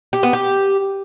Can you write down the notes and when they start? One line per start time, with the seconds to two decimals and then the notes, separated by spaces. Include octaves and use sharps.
0.13 G4
0.23 B3
0.33 G4